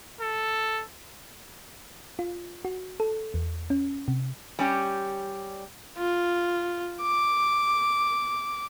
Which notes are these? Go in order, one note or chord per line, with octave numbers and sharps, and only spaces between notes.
A4
F4
F#4
A4
E2
C#4
C3
G3 C#4 G4
F4
D6